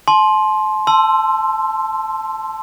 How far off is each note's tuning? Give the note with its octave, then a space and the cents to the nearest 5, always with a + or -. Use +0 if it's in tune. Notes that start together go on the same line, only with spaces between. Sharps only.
A5 -40 C6 +10
A5 +0 C6 +0 E6 +20